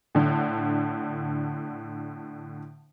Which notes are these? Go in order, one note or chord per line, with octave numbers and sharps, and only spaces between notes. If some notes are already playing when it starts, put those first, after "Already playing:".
A2 D3